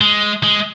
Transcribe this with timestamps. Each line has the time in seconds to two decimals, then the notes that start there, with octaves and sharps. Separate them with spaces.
0.01 G#3
0.43 G#3